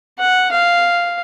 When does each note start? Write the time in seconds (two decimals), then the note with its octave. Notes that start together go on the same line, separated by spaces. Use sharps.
0.19 F#5
0.51 F5